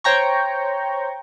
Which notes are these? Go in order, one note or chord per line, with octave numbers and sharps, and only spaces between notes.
C5 C#5 G5 A#5 C#6